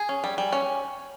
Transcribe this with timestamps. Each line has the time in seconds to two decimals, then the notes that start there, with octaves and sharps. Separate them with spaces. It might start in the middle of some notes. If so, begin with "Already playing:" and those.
Already playing: G#4
0.09 C#4
0.24 G3
0.38 G3
0.53 C#4